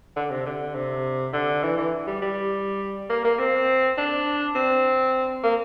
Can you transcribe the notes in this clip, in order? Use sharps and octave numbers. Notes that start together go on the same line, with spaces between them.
D3
C3
D3
C3
D3
E3
E3
G3
G3
A#3
A#3
C4
D4
C4
A#3